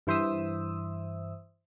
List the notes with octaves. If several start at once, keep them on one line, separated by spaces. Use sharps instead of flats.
G2 E3 C5 E5 D#6 E6